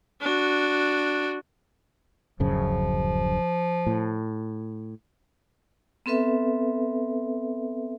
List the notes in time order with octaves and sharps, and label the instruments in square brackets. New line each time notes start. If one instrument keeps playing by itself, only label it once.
[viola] D4 F#4
[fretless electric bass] D1 F#2 C#3 [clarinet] F3
[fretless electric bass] A2
[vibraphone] B3 C4 A4 B4 E5